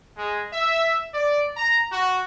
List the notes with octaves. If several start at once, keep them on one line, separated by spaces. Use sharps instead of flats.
G#3
E5
D5
A#5
F#4